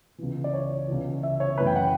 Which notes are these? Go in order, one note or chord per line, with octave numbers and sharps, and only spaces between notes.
C#2 C#3 E3
D5
C#5
C#2 C#3 E3
E5
C#5
F#2 C#3 E3 A3 B4
G5
F#5